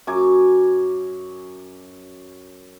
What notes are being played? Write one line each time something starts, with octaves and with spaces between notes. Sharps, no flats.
F#2 G#5 D6